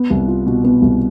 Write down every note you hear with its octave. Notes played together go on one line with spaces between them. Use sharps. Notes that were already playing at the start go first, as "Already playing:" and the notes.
Already playing: B3
C2
F4
B2
B3
C2